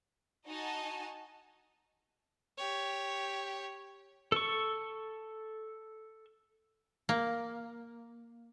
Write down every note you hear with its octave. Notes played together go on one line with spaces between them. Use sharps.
D#4 F#4 D#5 G#5 A5
G4 C#5
A4 C#6
A#3